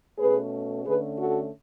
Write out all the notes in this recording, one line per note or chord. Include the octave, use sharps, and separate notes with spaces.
B2 A3 C#4 G#4 B4
D3 A3 C#4 G#4 B4
F#4 A4